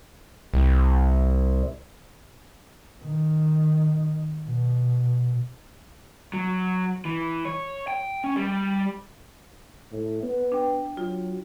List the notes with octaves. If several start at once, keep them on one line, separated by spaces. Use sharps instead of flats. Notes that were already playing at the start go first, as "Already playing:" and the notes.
C2
D#3
B2
F#3
E3
C#5
G5
C#4
G3
A2
B3
D4 G5
F#3 F4